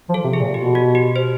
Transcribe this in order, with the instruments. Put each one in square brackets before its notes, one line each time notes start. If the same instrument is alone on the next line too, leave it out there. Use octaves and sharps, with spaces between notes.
[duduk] F3
[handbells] A4
[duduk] C3
[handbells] G#4
[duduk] A#2
[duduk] B2 [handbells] G4
[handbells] F#4
G4
C5